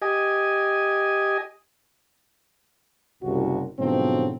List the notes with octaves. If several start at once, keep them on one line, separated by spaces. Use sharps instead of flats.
G4 D#5 G#5
F#1 C2 F#4
G#2 B2 D3 F3 F#3 C4